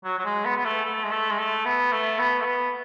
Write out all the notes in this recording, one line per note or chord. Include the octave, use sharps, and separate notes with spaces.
F#3
F#3
G#3
B3
B3
A3
A3
G#3
A3
G#3
A3
B3
A3
B3
A3
B3